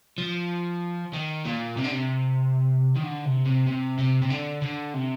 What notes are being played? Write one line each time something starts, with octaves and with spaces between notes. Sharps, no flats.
F3
D#3
A#2
C3
D3
C3
D#3
D3
C3
C3
C3
C3
C3
D3
D3
C3